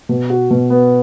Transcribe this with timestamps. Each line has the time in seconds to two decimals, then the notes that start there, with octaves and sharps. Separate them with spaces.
0.09 B2
0.30 F#4
0.51 B2
0.70 B3